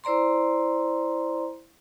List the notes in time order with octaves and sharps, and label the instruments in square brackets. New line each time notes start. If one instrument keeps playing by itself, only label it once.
[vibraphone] E4 C5 D5 A#5 C6